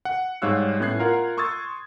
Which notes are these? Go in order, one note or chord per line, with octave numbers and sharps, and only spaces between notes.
F#5
G#2 G3 C#5 F5 E6 F#6
A2 B3 C#4 F#6 G#6 C7
F4 A#4 F5 F#5
C6 C#6 D#6 E6 G#6 A6